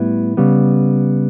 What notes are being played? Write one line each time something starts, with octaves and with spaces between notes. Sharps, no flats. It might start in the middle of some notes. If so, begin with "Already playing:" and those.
Already playing: A2 G3 B3 E4
C#3 G3 B3